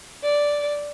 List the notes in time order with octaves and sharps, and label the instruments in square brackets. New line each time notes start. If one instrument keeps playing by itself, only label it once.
[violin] D5